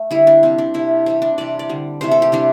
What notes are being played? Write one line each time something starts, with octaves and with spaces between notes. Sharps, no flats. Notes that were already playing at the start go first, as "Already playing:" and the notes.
Already playing: A3
D3 G3 E4
D4
C3 G3 C4
D4
C3 G3 E4
C3 E3 G3 C4
D4
C3 E3 G3 D5
D5
D3 G3
C3 E3 A3 C5
A4
G4
C3 E3 G3 D4